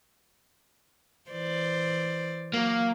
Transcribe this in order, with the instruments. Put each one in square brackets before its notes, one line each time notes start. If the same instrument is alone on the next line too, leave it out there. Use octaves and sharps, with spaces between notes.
[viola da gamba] E3 C5 D5
[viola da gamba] F#3 [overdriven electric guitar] A#3